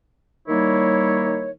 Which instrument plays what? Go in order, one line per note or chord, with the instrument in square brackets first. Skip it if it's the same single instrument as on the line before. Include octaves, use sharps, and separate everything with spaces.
[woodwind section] D#3 G3 A#3 D#4 E4 C#5